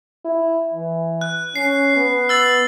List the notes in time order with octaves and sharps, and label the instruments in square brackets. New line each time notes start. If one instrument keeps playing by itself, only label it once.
[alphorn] E4
E3
[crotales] F#6
[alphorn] C#4 [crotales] C7
[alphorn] B3
[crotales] E6 A6 F#7